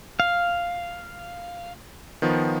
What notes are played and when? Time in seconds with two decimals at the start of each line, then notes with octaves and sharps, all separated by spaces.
0.20 F5
2.22 D#3 F3 B3